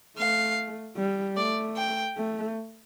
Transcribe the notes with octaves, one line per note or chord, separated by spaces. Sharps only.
A3 F5
G3
A3 D5
G5
A3